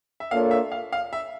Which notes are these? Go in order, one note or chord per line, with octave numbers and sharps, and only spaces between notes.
E5
A#3 D4 F4 A4 C#5 F5
E5
F5
F5
E5